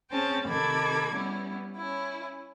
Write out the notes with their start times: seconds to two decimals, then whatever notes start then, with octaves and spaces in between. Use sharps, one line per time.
0.11 C4 C#4 G#4 C5 G5 A5
0.47 C3 D#3 A4 B5 D6 G#6
1.12 G3 B3 C#4 E4
1.75 C#4 E4